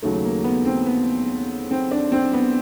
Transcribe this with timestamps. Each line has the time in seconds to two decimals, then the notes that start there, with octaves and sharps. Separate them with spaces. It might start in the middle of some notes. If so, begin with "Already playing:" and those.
0.02 D#2 C#3 F#3 A3
0.24 A#3
0.44 B3
0.65 C4
0.86 B3
1.71 C4
1.91 D4
2.12 C4
2.33 B3